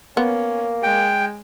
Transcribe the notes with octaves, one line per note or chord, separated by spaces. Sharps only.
A#3 B3 C#4
G#3 G5